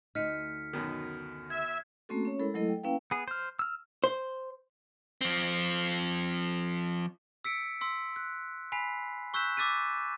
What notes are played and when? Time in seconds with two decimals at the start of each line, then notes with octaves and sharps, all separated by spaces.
0.15 D2 D#4 F6 B6 C#7
0.73 F#2 B2 D#3
1.50 E5 G#6
2.09 A3 A#3 C4 C#4 F#4 A4
2.25 C#4 C#5
2.39 G#3 E4 A4 A#4 B5
2.54 F#3 A3 E4 A4 D#5
2.68 G5
2.83 A#3 C#4 E4 B4 F5 G5
3.11 B3 G#4
3.28 C5 F6
3.59 E6 F6
4.04 C5
5.21 F3 C4
7.44 E6 B6 C#7 D7
7.81 C6 E6 B6
8.16 F#6
8.72 G#5 B5 B6 C7
9.34 C#6 E6 F#6 G6 B6 E7
9.57 D6 E6 A6 B6 D#7